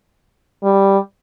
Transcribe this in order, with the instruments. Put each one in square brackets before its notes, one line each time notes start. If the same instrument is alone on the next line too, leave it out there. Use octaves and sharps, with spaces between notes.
[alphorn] G3